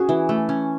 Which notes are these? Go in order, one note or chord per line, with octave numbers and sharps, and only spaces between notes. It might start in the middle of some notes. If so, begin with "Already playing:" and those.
Already playing: C#4 F#4 G#4
E3
A3
C#4